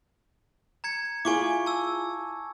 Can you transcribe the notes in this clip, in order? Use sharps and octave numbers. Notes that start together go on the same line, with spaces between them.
A#5 G#6 C#7
E4 F4 G#4 G#5 C#6 D6
A5 E6